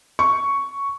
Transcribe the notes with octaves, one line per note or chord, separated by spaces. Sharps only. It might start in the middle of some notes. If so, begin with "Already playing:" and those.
C#6